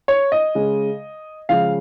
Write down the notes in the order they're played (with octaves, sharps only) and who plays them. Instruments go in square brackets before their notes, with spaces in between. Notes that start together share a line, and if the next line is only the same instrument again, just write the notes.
[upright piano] C#5
D#5
C#3 G#3
C#3 F3 G#3 F5